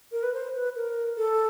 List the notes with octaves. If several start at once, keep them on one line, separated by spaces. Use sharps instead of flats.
A#4
B4
C5
B4
A#4
A4